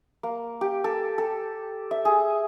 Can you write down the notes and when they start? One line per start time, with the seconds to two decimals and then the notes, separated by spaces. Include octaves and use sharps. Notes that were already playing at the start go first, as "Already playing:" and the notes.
0.23 A#3
0.61 G4
0.84 A4
1.18 A4
1.91 E5
2.05 G#4